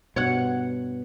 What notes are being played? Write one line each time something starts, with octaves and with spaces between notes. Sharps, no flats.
G2 B2 C#5 F#5